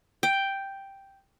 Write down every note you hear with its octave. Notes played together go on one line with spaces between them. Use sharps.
G5